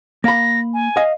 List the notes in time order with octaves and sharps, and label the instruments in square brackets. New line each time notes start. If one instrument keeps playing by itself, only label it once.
[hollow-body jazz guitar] A#3 B5 [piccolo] A#6
[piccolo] G#5
[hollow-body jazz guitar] D#5 F5